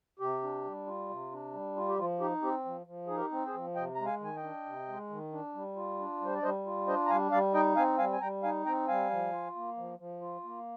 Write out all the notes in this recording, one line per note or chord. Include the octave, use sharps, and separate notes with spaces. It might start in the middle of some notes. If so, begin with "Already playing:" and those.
C3 G4
D4
G3
F4
C3
D4
G3
F4
G4
F3 F4
D#4 G4
C4 G4
F3
F3
D#4 G#4
G4 A#4
C4
G#4 C5
F3
C3 D#5 G5
G#3 A#5
F5 G#5
D#3 G#5
D#5 G5
D4
C3
G#3
D#3
D4
G3
F4
D4
G3 C5
D5
G3 C5 D#5
F4
D4 C5 D#5
A#5
G3 F5 G#5
G3 D5 F5
D#4 D#5 G5
C4 F5 G#5
G3 F5 G#5
G#5
G3 G5 A#5
D#4 F5 G#5
C4 G5 A#5
G3 F5 G#5
F3
F4
A#3
F3
F3
F4
A#3